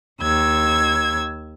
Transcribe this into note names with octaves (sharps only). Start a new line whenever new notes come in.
D#2 E6 G#6